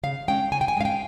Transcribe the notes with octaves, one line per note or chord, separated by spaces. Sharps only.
C#3 F5
G#3 C#4 G5
C#3 G#5
G5
G#5
G#3 C#4 F5
G5